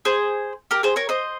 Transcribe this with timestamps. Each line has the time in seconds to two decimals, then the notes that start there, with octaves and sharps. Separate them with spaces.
0.05 G#4 C5
0.71 G4 A#4
0.83 G#4 C5
0.96 A#4 C#5
1.09 C5 D#5